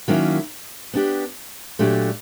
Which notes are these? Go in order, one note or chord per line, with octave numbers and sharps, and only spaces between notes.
D#3 F#3 A#3 C#4 E4
B3 D4 G4
A#2 F#3 A3 D4 G4